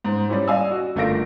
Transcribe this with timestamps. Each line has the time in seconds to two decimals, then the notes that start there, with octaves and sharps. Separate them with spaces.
0.05 G#2 C5
0.28 G3 C#4 E4 G4 C5
0.48 D5 D#5 F5 G#5 E6
0.71 F#4
0.96 G1 A3 A#3 F4 A#6 D7